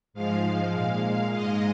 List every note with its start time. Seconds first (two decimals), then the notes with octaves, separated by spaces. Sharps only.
0.14 G#2 F3 G#3 F5
0.73 A#2 G#3
1.33 G#2 G#3 D#5